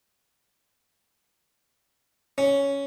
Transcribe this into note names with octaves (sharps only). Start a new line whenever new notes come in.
C#4